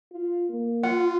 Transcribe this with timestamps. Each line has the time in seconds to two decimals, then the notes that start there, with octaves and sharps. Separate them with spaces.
0.12 F4
0.49 A#3
0.83 F4 F#5